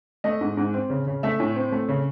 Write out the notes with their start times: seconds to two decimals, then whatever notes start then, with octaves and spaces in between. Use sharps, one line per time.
0.24 A3 D#5
0.41 G#2
0.57 G#2
0.74 C4
0.90 C#3
1.07 C#3
1.23 A3 E5
1.40 A2
1.56 C4
1.72 A3
1.89 C#3